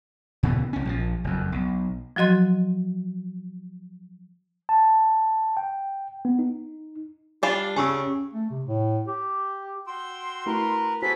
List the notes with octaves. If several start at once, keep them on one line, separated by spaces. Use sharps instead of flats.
A#2 C#3 E3 B3
C2 C#4
A#1 C#3 F3
F#1 F2
B1
F3 F#3 F#4 D#5 C6
A5
G5
B3
D#4
G3 D4 F4 G#5
C#3 C#4 G4 G#5 C#6 E6
A3
C3
A2
G4
F#4 G5 C6 E6
A3 E4 F#4 A#4 B4
F#4 G#4 A4 B4 C5 B6